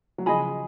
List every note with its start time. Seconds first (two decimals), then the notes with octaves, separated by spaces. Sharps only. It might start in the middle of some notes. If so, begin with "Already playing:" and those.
0.18 F#3
0.26 C#3 F3 G#4 D#5 G#5 B5